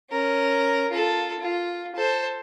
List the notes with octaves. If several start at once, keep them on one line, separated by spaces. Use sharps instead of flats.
C#4 A#4
F4 A4
F4
A4 C5